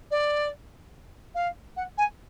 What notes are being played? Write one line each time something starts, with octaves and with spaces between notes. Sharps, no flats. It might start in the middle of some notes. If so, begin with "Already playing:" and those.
D5
F5
F#5
G#5